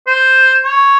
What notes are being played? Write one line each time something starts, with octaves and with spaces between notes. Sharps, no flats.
C5
C#5